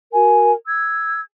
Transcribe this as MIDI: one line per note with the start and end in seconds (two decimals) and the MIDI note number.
0.13 0.52 66
0.13 0.52 70
0.13 0.52 80
0.68 1.21 88
0.68 1.21 92